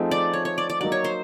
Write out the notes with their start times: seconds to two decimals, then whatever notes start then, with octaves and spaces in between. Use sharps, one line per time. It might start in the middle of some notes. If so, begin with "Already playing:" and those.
Already playing: F3 A3 C4 D#4 G#4
0.11 D5
0.33 C#5
0.45 C#5
0.58 D5
0.70 D5
0.80 F#3 A#3 D#4 F#4 D5
0.92 C#5
1.04 C5